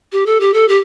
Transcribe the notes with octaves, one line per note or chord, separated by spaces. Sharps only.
G4
A4
G4
A4
G4